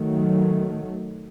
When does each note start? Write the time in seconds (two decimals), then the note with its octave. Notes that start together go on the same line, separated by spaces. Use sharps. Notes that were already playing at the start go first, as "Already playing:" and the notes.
Already playing: D#3 F#3 A3